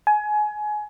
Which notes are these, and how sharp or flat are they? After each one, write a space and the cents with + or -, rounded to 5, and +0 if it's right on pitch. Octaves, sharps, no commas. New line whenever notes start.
G#5 +25